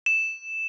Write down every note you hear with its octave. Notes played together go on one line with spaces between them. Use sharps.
E7